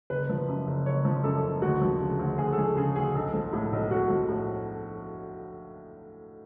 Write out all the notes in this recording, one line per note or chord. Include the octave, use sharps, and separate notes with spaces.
F#1 B4
F3
F#2
F#1
F#1 C#5
F3
F#2 A4
F#1
D2 F#4
F3
C#3
D2
D2 G#4
A4
F3 G#4
C#3 G#4
D2 G#4
B1 A4
F3
A2
B1
B1 F#4
F3
A2